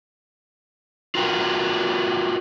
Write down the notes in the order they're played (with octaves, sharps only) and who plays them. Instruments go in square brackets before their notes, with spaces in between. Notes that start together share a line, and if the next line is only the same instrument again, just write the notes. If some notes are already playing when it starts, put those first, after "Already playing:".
[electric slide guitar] F4 F#4 A#4 B4 G5